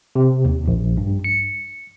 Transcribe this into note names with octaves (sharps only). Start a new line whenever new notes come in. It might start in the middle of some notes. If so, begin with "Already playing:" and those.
C3
D#2
A#1
G2
C#7